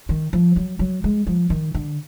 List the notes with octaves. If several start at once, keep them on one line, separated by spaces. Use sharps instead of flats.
D#3
F3
F#3
F#3
G#3
F3
D#3
D3